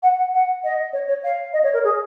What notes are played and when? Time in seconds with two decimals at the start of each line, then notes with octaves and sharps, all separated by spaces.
0.03 F#5
0.18 F#5
0.34 F#5
0.64 D#5
0.93 C#5
1.08 C#5
1.24 F5
1.53 D#5
1.64 C#5
1.74 A#4
1.84 G#4